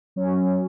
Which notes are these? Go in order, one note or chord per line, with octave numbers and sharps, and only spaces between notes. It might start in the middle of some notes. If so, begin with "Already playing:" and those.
F#3 C#4